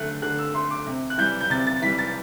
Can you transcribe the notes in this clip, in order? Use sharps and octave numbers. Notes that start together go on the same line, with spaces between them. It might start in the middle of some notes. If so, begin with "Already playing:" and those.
Already playing: D3 A3 F#6
D3 F#6
E6
A3 C6
D6
C3
F#6
E3 G3 G6
G6
C3 A6
A6
E3 G3 B6
A6